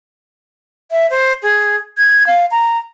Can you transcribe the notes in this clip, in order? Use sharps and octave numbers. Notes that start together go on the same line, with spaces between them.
E5
C5
G#4
G#6
F5
A#5